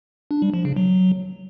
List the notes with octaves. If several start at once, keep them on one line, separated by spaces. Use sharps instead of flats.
D4
G3
F3
C#3
F#3